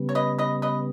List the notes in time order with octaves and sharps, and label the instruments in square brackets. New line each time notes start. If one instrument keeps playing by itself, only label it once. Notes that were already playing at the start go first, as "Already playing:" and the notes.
Already playing: [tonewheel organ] C#3 G3 B3
[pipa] C#5
B4 D#5
B4 D#5
B4 D#5